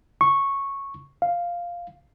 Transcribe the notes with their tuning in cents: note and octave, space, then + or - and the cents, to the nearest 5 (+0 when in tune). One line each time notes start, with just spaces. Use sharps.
C#6 -10
F5 -5